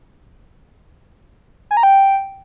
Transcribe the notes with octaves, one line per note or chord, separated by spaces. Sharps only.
G#5
A#5
G5